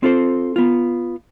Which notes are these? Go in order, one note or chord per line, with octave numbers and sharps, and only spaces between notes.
C4 F4 A4 C5
B3 F4